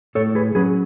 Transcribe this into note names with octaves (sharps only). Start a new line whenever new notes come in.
A2 A4 C#5
G#4 B4
F#3 C#4 G#4 B4